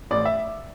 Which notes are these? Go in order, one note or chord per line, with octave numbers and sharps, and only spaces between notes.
A1 D5
E5